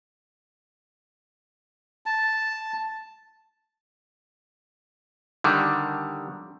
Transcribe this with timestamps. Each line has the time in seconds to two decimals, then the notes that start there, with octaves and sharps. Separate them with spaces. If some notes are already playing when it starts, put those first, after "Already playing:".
2.06 A5
5.44 D3 D#3 G3